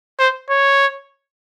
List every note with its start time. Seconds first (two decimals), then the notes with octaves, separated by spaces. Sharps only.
0.19 C5
0.50 C#5